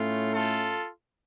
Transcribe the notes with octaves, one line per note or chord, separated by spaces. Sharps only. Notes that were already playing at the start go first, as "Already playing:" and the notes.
Already playing: A2 A3 C#4 F4
F4 A4